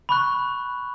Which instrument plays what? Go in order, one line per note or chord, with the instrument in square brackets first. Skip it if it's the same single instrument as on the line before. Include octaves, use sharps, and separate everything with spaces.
[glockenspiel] B5 C#6 F#6